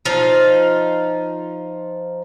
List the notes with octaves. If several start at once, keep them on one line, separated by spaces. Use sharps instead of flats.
F3 D#4 F4